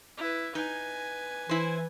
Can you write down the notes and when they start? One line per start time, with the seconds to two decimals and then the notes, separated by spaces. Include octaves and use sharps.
0.18 E4 B4
0.55 D#4 B4 G#5
1.49 E3 E4 C5